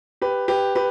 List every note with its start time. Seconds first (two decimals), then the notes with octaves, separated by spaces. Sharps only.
0.22 G4 B4
0.48 G4 B4
0.75 G4 B4